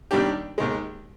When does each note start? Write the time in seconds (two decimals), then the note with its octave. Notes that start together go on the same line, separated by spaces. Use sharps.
0.11 D#2 D#3 G3 D4 G4
0.58 D#2 D#3 G#3